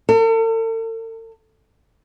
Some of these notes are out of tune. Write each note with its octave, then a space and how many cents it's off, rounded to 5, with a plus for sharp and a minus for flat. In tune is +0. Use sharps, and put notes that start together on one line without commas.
A4 +45